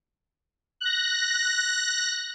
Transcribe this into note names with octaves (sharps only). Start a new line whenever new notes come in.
F#6 A#6